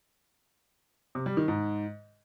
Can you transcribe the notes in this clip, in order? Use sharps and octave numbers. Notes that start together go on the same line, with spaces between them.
C3
G3
D#3
G#2